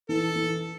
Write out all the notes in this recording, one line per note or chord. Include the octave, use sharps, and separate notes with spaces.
E3 A4
E3